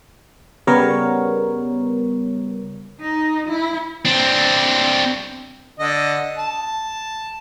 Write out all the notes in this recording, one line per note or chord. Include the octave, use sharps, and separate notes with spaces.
C#3 G3 B3 A#4 C#5
D#4
E4
C4 D4
D3 D#5
A5